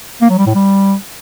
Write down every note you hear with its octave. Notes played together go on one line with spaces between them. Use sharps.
A#3
F#3
G3
A2
G3